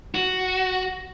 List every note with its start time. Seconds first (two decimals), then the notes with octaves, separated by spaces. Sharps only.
0.15 F#4